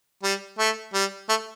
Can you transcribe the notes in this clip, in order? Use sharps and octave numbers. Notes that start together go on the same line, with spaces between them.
G3
A3
G3
A3